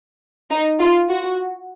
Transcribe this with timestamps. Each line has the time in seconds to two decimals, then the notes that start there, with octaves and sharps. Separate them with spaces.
0.50 D#4
0.79 F4
1.09 F#4